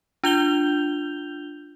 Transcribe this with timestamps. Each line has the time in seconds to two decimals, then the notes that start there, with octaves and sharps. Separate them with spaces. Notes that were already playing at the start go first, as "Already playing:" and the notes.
0.24 D4 F4 G6 F7 G7